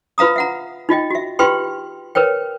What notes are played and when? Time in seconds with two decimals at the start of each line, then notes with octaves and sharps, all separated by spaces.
0.18 F4 B4 F5 A#5 D#6
0.36 E5 F#5 A#5
0.89 D#4 F4 D#5 G5
1.10 F#4 E5
1.39 F4 G4 B4 G5 C6
2.15 A#4 B4 C#5 G5